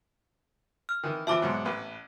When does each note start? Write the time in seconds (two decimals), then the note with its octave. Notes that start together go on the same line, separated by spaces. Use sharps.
0.89 F6
1.03 D#3 E3
1.27 E3 F3 E5 A5 D6
1.42 G#2 B2 F#3
1.65 A1 B4